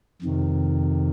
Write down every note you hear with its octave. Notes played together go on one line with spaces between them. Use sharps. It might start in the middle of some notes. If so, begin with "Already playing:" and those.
F2 C3 D#3